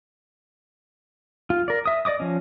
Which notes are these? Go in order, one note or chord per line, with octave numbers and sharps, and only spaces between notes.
F4
A#4 D5
E5 D#6
D5 D#5 D6 D#6
F3 C#4